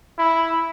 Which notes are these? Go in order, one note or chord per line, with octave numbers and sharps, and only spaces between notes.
E4